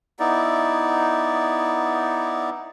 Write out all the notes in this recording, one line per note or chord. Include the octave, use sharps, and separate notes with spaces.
B3 D#4 E4 D5